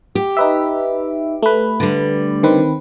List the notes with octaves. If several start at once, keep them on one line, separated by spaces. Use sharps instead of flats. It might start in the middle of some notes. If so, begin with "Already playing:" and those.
G4
D#4 B4 E5
A3 B4
D3 G3
D#3 C4 B4